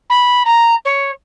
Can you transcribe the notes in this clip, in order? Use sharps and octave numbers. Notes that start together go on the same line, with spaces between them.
B5
A#5
C#5